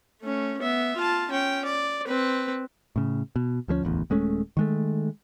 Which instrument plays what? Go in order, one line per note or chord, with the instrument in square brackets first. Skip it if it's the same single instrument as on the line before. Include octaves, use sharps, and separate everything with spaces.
[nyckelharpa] A3 C#4
B3 E5
F4 A5
C#4 G5
D5
C4 B4
[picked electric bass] A2 C#3
B2
D2 F3 G3 C#4
D1 A1 E2
D#1 G#3 A3 C#4
D#3 G#3 A3